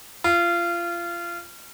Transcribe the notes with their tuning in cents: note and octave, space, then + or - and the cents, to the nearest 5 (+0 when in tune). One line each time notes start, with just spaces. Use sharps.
F4 -25